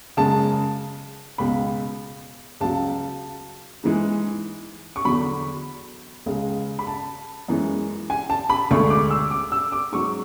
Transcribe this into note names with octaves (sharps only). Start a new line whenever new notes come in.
F#2 C#3 G#3 A5
C#2 B2 G#3 B5
C#2 C#3 F#3 A5
G#2 E3 G#3
C#6
E2 D3 F#3 B5
C#2 C#3 G#3
B5
A5
F#2 E3 G#3
G#5
A5
B5
D2 D3 G#3 C#6
D6
E6
D6
E6
D6
G#2 F#3 C#6